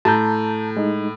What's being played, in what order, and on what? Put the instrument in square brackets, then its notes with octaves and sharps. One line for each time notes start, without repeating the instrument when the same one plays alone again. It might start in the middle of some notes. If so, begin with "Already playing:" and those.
[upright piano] A2 [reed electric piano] A5 A#5 G6
[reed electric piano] G#3 D#4